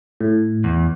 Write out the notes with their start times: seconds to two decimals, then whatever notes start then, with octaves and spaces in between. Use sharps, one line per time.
0.21 A2
0.64 E2